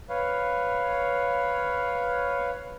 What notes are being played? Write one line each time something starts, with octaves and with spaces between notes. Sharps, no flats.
B4 C#5 F5